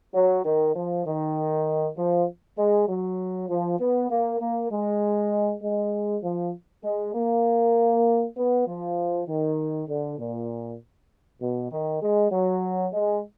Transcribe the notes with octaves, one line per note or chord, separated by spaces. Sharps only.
F#3
D#3
F3
D#3
F3
G#3
F#3
F3
B3
A#3
A#3
G#3
G#3
F3
G#3
A#3
B3
F3
D#3
D3
A#2
B2
D#3
G#3
F#3
G#3